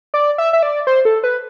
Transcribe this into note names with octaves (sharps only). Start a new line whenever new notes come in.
D5
E5
E5
D5
C5
A4
B4